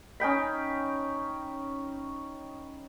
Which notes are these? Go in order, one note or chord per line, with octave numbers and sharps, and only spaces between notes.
C#4 D#4 G5 B5